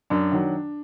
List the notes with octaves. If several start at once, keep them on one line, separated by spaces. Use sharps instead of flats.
F#2 D4
D#3 F#3